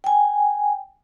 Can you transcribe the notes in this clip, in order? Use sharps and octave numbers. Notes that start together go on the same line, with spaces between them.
G5 G#5